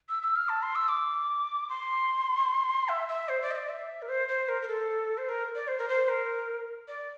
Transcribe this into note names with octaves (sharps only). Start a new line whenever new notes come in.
E6
E6
F6
A5
C6
E6
D6
C6
E5
E5
C5
D5
E5
D5
E5
A#4
C5
C5
A#4
A#4
A4
C5
A#4
D5
C5
A#4
C5
A#4
D5